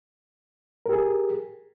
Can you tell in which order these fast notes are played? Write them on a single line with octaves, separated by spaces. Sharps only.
A#4 G4 G#4